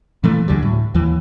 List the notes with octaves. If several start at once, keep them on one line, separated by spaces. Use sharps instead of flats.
A#2 E3 A3
D2 D3 F#3 G3
A2
D#2 E3